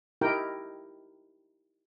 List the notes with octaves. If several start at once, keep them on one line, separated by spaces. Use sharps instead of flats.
D#4 E4 G4 A#4 G5